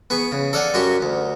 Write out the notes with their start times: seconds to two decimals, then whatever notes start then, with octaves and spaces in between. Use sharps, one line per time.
0.10 B3 G#4 C#6
0.32 C#3
0.53 A4 D5 F5 F#5 G#5
0.74 F#2 F#4 G4 C#6
1.02 D2